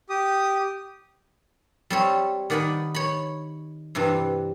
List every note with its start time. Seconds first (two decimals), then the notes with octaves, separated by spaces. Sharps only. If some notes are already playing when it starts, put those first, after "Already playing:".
0.10 G4 D#6
1.90 G3 C4 C#5
2.50 D#3 D5 F#5 G#5 B5
2.95 C#5 B5
3.95 G2 C3 E3 G3